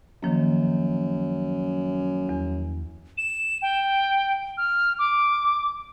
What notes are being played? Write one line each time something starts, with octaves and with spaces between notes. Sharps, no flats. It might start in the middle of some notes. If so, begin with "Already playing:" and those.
F#2 D#3 F3 A#3
E2
E7
G5
F6
D6